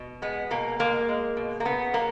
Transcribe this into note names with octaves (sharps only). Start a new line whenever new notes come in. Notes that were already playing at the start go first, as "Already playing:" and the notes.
Already playing: B2
G#3 B3
B2 A#3
G#3 A#3
G#3
B2
A#3
C#3 B3
F#3 A#3